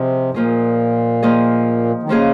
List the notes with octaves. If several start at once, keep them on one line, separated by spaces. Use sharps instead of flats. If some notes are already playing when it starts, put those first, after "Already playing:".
Already playing: C3 F3 F4 G#4 D#5
G#2
A#2 F3 A#3 F4 G#4 D#5
F3 A#3 F4 G#4 D#5
D#3
C#3 F3 A#3 F4 G#4 D#5